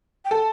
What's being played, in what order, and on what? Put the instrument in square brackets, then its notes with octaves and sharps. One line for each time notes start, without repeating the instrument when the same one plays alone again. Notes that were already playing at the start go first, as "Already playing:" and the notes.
[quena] G5
[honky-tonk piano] A4 [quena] A5